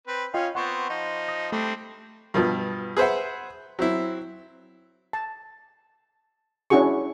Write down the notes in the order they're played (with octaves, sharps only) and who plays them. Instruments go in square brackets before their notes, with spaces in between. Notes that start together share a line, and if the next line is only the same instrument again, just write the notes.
[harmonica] C4 B4
[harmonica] C#4 F5 [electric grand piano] F4 D#5 G5
[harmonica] B3 C4 [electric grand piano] F#5 C6 C#6
[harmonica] F3 D#4
[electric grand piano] D#6 A#6
[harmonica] G3 C4 D4 [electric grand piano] A3
[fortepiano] G2 B2 F3
G#4 B4 C5 E5 F#5
F#3 C4 E4
[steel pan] A5
C#4 D4 E4 F#4 G#4 C#6